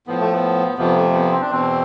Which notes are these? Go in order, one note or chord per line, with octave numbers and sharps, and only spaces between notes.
A2 F3 B3
A3
B3
F2 C3 F3 B3
A3
B3
C4
D4
E2 B2 C4